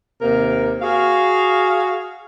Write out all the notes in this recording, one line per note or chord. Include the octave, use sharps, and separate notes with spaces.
D#2 C3 A#3 A#4
F#4 G#4 F5